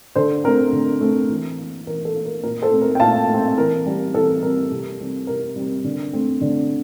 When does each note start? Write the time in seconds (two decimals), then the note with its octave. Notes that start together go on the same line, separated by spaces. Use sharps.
0.15 D3 A4 C5
0.44 A3 C4 A#4
0.73 D3
1.01 A3 C4
1.29 E3
1.58 A#3
1.87 E3 A#4
2.05 A4
2.16 A#3
2.25 A#4
2.43 A#2 A#4
2.62 A4 C5
2.72 A3 C4
2.82 A#4
2.95 G5
3.00 A#2 F5 A5
3.28 A3
3.34 C4
3.57 E3 A#4
3.86 G3 C4
4.14 E3 A4
4.42 G3 C4 A#4
4.71 C3
4.99 G3 C4
5.27 C3 A#4
5.56 G3 C4
5.84 D3
6.13 A3 C4
6.41 D3